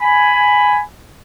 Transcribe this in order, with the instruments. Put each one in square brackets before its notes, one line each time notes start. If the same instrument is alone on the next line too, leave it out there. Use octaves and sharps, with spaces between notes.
[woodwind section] G#5 B5